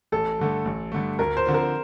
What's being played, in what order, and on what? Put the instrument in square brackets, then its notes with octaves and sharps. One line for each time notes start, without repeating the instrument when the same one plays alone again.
[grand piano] A1 [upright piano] A4
[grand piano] G2 D3 A3
A1
G2 D3 A3
[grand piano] D2 [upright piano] A#4
[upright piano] C5
[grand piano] D3 F3 C4
[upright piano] A#4